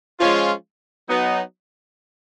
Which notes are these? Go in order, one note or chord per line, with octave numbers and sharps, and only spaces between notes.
F3 G#3 C#4 F4
F#3 B3 D#4